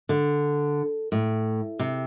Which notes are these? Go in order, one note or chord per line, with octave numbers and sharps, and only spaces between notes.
D3
A2
C3